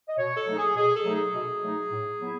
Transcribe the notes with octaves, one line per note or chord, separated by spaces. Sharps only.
D#5
B2 C#5
A4
F#3 A3 D#4
G#4
B2 G#4
A4
F#3 A3 D#4
G#4
B2
F#3 A3 D#4
A2
F#3 B3 E4